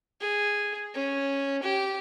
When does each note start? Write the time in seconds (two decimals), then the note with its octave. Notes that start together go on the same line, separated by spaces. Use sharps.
0.21 G#4
0.94 C#4
1.63 G4